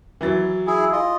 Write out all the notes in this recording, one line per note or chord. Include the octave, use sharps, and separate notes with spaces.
E3 F#3 A6
E4 G#4
F4 D#5